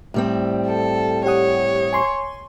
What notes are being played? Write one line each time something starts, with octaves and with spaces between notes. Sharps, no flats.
A2 G3 C4
A4
G4 C#5 F#5 D#6
G#5 C6 C#6